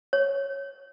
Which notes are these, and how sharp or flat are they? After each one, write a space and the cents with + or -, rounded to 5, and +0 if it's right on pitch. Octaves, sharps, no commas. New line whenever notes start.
C#5 -5